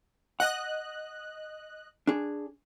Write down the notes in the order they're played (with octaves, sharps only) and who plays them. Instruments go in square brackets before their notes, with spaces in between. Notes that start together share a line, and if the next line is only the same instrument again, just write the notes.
[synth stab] D#5 F#6 [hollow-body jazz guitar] F#5
[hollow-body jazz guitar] D4 G#4